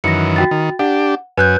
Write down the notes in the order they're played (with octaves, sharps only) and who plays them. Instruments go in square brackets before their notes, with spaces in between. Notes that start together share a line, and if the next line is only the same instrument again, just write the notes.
[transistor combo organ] F#2 D#3 E3 [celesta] A#6 C#7
[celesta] F#4 G5 A6
[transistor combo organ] D#3
[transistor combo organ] D4 G4 [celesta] F#5
[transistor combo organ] F#2 G#5 [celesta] B4 F#6 G6